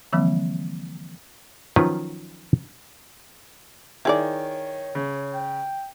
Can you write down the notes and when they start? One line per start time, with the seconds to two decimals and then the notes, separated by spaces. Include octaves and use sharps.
0.13 D3 E3 F3 G3 A#3 C4
1.76 D#3 F3 F#3 C#4 F4 B4
4.05 D#3 E4 G#4 C#5 D5
4.95 C#3
5.34 G5